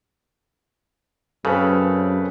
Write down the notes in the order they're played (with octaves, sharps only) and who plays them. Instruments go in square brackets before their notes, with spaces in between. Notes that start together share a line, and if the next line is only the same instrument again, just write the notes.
[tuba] F#2 [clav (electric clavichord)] C#3 [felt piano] C4 A4 B4